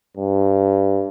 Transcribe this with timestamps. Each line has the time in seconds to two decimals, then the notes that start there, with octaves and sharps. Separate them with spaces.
0.17 G2